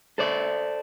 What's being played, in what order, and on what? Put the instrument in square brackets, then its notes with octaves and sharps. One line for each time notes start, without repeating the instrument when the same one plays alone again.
[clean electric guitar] A4 C5 D5